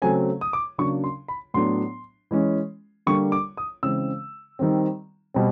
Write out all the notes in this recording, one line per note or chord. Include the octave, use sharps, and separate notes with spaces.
C#3 F#3 A3 C4 G#5
D#6
D6
C#3 F#3 A#3 D4 C#6
C6
B5
A2 F#3 B3 D4 C6
E3 G#3 C#4
D3 G3 A#3 D4 C#6
D6
D#6
C#3 E3 G#3 C4 E6
D#3 G3 C4
B2 G3 C4